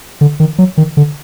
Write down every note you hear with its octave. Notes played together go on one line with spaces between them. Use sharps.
D3
D#3
F#3
D#3
D3